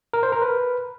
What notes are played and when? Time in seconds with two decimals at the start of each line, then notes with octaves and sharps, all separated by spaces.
0.13 A#4
0.23 C5
0.32 A#4
0.42 B4